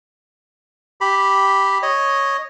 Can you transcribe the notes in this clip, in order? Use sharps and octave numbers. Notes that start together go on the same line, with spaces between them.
G4 B5
C#5 D#5